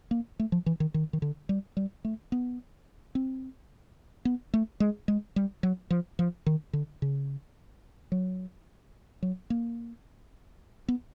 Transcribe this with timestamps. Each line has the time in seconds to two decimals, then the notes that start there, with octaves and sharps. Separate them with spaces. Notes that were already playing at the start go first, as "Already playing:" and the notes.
0.11 A#3
0.39 A3
0.52 F3
0.66 E3
0.80 D#3
0.94 D#3
1.13 D#3
1.22 D3
1.49 G3
1.77 G3
2.05 A3
2.32 B3
3.15 C4
4.25 B3
4.54 A3
4.80 G#3
5.08 G#3
5.36 G3
5.63 F#3
5.90 F3
6.19 F3
6.46 D#3
6.73 D3
7.02 C#3
8.12 F#3
9.22 F#3
9.50 A#3
10.88 B3